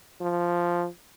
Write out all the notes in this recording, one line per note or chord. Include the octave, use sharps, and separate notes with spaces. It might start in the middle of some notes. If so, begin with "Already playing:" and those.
F3